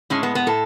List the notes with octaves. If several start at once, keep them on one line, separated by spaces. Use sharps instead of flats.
A2 G#3 C#4
B3
B3
A2 A4